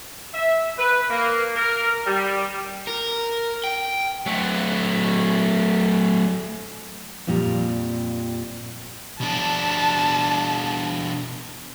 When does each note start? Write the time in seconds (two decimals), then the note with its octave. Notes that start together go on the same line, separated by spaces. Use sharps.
0.34 E5
0.79 B4
1.10 A#3
1.56 A#4
2.07 G3
2.87 A#4
3.64 G5
4.26 F#3 A3
7.27 F2 A#2 G3 A#5
9.21 B2 D4 A5